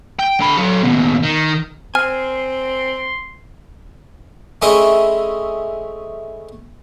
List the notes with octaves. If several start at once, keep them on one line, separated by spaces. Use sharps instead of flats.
G5
D3 B5
F#3 A4
D#2 B2
D#3
C4 G#5 C6 F6
A3 C4 C#4 E4 G#4 D#5